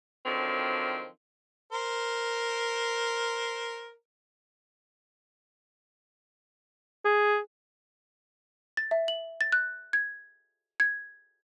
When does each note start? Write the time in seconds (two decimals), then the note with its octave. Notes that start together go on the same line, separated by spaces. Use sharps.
0.25 D3 D#3 F3 F#3 C4
1.72 A#4 C5
7.05 G#4
8.77 A6
8.91 E5
9.08 F#7
9.41 A6
9.52 F#6
9.93 G#6
10.80 G#6